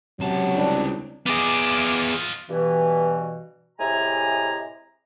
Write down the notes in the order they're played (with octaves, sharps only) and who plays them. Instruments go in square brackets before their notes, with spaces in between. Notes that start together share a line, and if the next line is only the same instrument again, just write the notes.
[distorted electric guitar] C#2 A5 [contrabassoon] C3 [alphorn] F#3
[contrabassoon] C2 [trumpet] D4
[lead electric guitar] B3 G#4 [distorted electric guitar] F4 D#5 [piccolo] D6
[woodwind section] G2 B2 E3
A2 C3 G#3 G#5 A#5